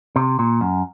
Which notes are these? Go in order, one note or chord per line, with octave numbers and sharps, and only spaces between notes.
C3
A#2
F#2